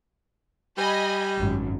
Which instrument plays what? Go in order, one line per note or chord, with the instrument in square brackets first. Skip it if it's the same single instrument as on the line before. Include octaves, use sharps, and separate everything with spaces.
[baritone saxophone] G3 [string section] D#5 G#5 B5
[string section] G#1 F#2